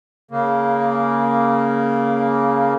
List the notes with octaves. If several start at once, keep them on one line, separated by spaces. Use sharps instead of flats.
C#3 A#3